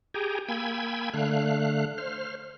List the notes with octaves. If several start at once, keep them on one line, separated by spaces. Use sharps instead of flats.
G4 G#4 G5 G#5 A#5
A#3 G5 G#5 B5 E6 G#6
D3 A3 F5 F#6
C5 F6